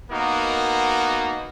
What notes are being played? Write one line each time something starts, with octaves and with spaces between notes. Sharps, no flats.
A#3 B3 D#4 F#4 A#4